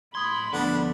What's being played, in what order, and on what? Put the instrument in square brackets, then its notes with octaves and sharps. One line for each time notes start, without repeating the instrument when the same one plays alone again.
[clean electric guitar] A2 C6 [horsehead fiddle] B5 [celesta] D#6 G#6
[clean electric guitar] D2 F3 B3 [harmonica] D4 [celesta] A4 F#5